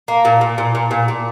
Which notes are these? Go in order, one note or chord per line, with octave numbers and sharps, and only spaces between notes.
A#3
A#2
A#2
A#2
A#2
A#2
A#2